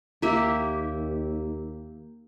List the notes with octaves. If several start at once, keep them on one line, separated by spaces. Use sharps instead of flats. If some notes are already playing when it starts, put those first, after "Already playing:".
D#2 A#3 G4 E5